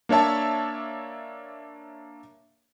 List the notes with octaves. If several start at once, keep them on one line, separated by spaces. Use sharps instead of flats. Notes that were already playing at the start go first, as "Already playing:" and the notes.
A#3 D4 C#5 E5 A5